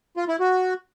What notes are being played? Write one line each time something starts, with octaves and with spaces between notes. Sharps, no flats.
F4
E4
F#4